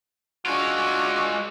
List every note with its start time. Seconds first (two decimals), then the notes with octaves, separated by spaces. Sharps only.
0.46 G#3 D4 F4 F#4 C#6